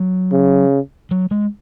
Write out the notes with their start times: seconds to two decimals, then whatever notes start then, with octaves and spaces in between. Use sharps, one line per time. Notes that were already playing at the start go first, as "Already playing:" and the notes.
Already playing: F#3
0.32 C#3
1.11 F#3
1.31 G#3